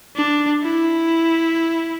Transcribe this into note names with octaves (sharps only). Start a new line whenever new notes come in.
D4
E4